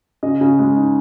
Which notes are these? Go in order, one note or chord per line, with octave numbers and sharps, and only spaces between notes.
C#3 D#5
C#3
G#3
D#4